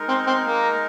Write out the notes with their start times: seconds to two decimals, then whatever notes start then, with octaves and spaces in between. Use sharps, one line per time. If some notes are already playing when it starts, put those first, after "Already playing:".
Already playing: G#3 D#4 A#4
0.08 C4
0.27 C4
0.46 A#3